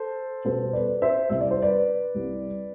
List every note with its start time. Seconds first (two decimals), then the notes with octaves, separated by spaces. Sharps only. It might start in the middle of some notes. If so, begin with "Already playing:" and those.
Already playing: A4 C5
0.45 B2 G3 B3 A4 C5
0.73 B4 D5
1.02 C5 E5
1.30 C2 C3 G3 E5
1.41 D5
1.51 C5
1.62 B4 D5
2.15 C2 C3 G3